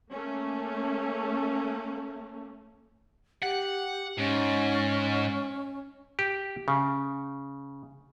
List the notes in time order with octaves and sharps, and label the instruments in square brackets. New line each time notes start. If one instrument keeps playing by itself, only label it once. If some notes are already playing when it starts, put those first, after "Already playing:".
[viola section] A3 A#3 C#4
[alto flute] G4 [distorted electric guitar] F#5
[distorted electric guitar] G#2 [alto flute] C#4
[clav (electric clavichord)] G4
C#3